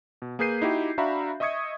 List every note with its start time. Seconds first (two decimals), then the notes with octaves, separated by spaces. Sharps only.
0.22 B2
0.39 A#3 G#4 B4 G6 C7 D#7
0.62 D#4 E4 F#4 G4
0.98 D4 F#4 E5 F5 A#5 B5
1.40 D#5 E5 C#6 D#6 G#6 C#7